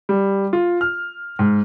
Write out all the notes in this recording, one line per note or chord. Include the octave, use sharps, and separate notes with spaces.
G3
F4
F6
G#2